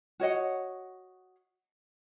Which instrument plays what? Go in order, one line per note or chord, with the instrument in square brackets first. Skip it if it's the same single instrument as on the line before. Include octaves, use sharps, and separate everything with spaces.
[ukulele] F#4 C#5 D#5 F#5